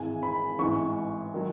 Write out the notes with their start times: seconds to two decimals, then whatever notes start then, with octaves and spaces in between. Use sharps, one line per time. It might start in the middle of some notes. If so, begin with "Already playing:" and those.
Already playing: G#1 G#2 E3 G#3 G#5
0.23 B5
0.59 A1 G#2 E3 C#6
1.34 D#3 F#3